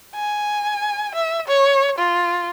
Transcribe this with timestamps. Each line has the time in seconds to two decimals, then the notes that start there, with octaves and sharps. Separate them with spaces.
0.15 G#5
1.15 E5
1.48 C#5
1.98 F4